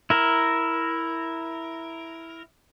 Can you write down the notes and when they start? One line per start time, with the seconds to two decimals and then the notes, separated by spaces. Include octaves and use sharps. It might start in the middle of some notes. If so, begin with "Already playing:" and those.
0.10 E4 A#4